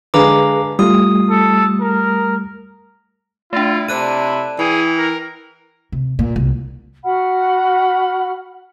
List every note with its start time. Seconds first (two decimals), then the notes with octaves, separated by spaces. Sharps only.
0.14 D3 G#3 G#4 B4 F5 A#5 D6
0.79 G3 A3 F4 D#6
1.30 A4
1.81 A#4
3.53 A3 D4 E4 F4
3.88 C3 C4 D4 E4 A4 F#6 D#7
4.59 E3 G#4 G5
4.98 A#4
5.92 C3
6.19 A#2
6.36 C2
7.04 F#4 F#5 B5 F6